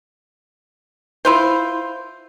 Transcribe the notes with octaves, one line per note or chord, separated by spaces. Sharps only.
E4 F4 C5